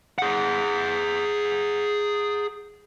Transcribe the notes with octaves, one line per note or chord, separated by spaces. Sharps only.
G#4 F#5